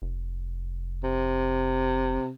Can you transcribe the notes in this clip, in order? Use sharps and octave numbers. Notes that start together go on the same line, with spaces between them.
F1
C3